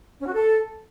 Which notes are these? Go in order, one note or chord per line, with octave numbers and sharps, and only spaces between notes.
C#4
F#4
A4